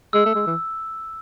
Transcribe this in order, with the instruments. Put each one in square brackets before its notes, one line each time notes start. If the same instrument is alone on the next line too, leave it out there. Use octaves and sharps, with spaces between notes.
[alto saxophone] G#3 [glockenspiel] E6
[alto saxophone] A3
G#3
E3